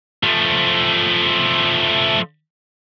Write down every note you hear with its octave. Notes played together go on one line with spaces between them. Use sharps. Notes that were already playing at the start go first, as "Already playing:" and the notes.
F3 A3